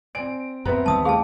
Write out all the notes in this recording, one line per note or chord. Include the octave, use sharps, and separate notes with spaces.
C4 D5 G#5 D7
F#2 B3 C4 B4 E5 A#5
D#2 D#3 G3 A5 D#6 E6
A1 G#4 F5 G5 A5